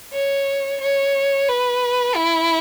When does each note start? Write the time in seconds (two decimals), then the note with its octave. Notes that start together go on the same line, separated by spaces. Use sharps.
0.14 C#5
0.81 C#5
1.48 B4
2.16 E4